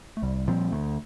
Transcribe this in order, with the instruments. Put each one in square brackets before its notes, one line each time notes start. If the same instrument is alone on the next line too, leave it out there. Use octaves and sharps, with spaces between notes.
[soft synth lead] A3
[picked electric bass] C2 [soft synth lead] G3
[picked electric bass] A#2 F3 C4
[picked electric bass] D2 [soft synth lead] A3